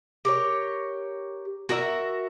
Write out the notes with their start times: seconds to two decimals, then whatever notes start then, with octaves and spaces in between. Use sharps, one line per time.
0.25 G4 A#4 C#5
1.69 F#4 A#4 D#5 E5